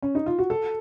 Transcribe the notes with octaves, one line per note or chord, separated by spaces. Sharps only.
C#4
D#4
F4
F#4
A4